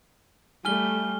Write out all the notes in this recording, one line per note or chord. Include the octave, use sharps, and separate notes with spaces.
G3 A3 G#5 F6 G7